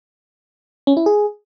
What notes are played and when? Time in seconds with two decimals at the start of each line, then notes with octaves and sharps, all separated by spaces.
0.87 C#4
0.97 E4
1.06 G#4